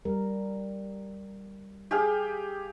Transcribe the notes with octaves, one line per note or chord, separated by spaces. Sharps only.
G3 A#4
G4 G#4 F5